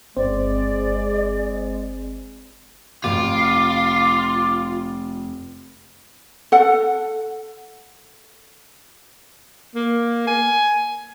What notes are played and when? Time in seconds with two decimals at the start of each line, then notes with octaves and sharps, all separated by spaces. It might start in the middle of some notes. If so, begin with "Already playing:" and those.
0.17 G1 G#3 C4 C5 D5
3.04 F1 F4 D6
6.52 A4 F#5
9.75 A#3
10.27 G#5